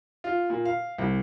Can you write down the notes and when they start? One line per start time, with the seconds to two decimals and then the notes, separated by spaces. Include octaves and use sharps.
0.24 F4
0.50 A#2
0.65 F5
0.98 C2